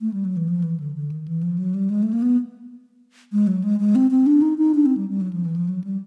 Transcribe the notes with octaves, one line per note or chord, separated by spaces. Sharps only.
A3
G3
F#3
E3
F3
E3
D3
D3
D#3
E3
F3
F#3
G3
G#3
A3
A#3
B3
G#3
F#3
G#3
G#3
C4
C4
D4
D#4
D#4
D4
C4
G3
G3
F#3
F3
E3
F3
F#3
G3